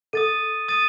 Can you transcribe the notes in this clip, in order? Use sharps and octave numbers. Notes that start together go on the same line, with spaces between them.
A4 D#6 A6 D#7
D#6 A6 D#7